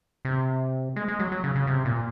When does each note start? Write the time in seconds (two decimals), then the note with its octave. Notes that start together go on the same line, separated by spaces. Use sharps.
0.25 C3
0.96 G#3
1.08 G#3
1.20 F#3
1.32 F#3
1.44 C#3
1.55 C#3
1.67 C3
1.85 A#2